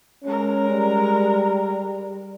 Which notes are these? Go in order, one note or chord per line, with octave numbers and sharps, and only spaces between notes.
G#3 C#4 A#4
G3